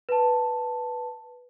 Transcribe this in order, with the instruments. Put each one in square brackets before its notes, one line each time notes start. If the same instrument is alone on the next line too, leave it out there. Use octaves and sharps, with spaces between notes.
[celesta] B4 A5